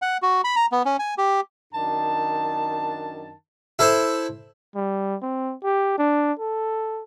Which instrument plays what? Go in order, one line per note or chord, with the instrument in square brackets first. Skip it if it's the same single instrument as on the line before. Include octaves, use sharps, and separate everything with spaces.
[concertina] F#5
F#4
B5
A#5
B3
C#4
G#5
G4
[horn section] F#2 D#3 D4 A5
[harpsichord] E4 A4 C5
[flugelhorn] G3
C4
G4
D4
A4